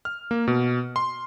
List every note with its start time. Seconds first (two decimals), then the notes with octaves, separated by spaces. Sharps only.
0.05 F6
0.31 A#3
0.47 B2
0.96 C6